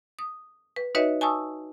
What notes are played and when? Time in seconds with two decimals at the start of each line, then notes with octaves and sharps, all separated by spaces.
0.19 D#6
0.76 B4
0.95 D#4 F#4 B4 C#5 D#5 E5
1.21 G#5 A5 C#6 D#6 E6